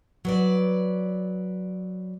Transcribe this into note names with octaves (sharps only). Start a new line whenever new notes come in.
F#3 B4 D5